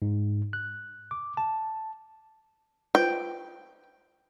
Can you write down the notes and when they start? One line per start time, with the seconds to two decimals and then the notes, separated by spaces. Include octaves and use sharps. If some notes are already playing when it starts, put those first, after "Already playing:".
0.02 G#2
0.53 F#6
1.11 D6
1.37 A5
2.95 F4 B4 C5 G5